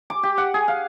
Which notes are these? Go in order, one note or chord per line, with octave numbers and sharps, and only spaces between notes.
D6
G4
F#5
G#4
F5